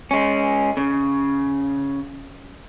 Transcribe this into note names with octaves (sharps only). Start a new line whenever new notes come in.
G#3 C#4
C#3